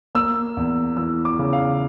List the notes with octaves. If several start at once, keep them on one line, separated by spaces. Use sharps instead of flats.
A#3 E6
E2
E3 E6
D6
C#3
F5